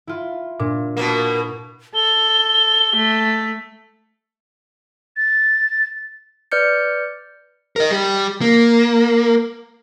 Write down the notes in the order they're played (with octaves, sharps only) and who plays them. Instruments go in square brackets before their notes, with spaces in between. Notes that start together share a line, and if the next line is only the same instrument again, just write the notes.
[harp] E4 F4
[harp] A#2 [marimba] D4
[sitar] B2 A#3
[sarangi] A4 [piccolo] G7
[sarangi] A3
[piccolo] A6
[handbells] B4 D5 F6 G6 C#7
[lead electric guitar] A#4 D#5
G3 G4
A#3